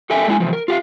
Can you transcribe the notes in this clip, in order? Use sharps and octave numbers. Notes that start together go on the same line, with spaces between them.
G4 A4 A#4 E5 G5 G#5
G#3 D4 E4 G#5
C3 E3 F3
A#4
F4 G4 F5